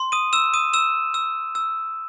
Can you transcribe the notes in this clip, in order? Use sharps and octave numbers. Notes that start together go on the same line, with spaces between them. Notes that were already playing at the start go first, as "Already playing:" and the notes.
Already playing: C6
D#6 D#7
E6 E7
D#6 D#7
E6 E7
E6
E6